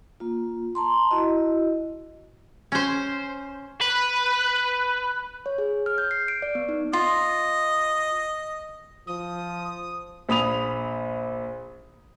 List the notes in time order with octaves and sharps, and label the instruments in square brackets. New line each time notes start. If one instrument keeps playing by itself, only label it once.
[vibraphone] A#3 F4
A5 A#5 C6
E4 F#4 D#5
[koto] C#4 C5
[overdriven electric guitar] B4
[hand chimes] C#5
G#4
F6
G6
C7
D7
D5
B3
D#4
[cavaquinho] F4 [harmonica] D#5
[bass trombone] F3 [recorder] D#6
[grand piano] A#1 B5 D#6 F7